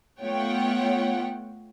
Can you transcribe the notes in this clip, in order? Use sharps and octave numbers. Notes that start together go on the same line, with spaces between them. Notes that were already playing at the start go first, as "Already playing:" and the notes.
A3 B3 F4 C#5 F#5 G5